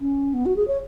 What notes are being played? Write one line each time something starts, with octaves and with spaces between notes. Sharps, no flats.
C#4
B3
F#4
G#4
C#5